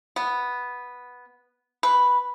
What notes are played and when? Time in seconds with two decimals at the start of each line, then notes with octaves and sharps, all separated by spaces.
0.16 B3
1.83 B4